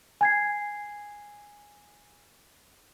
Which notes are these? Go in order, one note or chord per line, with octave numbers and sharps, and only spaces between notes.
G#5 G#6 C7